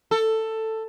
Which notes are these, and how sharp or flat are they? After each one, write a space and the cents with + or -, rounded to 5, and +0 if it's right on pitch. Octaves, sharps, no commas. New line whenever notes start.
A4 +10